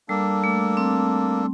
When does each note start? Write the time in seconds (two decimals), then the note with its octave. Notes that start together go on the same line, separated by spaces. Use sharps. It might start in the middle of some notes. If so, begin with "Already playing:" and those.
0.09 G3 A#3 D4 A4
0.44 A3
0.77 C4